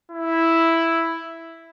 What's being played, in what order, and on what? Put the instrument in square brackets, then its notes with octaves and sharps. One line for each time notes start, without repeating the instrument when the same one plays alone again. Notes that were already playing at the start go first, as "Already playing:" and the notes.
[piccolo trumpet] E4